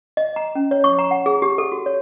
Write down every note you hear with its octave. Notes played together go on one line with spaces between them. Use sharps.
D#5
A#5
C#4
C#5
C#6
A#5
F#5
G#4
G4
A4
F#4
C#5